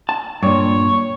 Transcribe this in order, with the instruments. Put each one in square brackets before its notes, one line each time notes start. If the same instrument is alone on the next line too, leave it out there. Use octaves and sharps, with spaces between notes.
[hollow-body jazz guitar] A5
[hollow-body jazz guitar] G2 A#2 [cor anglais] C#5